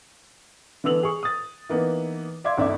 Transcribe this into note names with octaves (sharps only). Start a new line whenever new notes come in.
D3 E3 B3 E6 F7 F#7
G#4 C#6
D#6 A6
E3 A#3 B3 D#4
D5 E5 F5 C6 D6 G#6
G1 C#2 D4 D#4 D5 E5